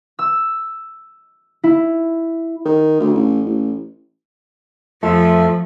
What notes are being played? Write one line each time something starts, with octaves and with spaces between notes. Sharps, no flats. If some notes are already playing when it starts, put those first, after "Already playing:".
E6
E4
D#3
D2
A1
A1
F2 F3 A3 F4 E5